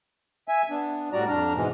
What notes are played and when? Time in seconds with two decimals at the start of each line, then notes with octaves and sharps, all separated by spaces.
0.48 E5 G#5
0.70 B3 D4
1.13 A2 G3 F#4 D5 A#5
1.28 F2 D4 A#5 F6
1.54 G#2 B2 E3 G#3